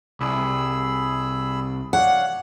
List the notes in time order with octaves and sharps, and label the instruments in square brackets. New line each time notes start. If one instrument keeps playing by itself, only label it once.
[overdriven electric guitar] C2 [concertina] G#4 B5 E6
[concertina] D4 C#5 F5 [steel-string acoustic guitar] F#5